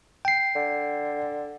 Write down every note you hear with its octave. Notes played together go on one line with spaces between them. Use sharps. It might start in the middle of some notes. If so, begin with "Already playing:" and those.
G5 C7
D3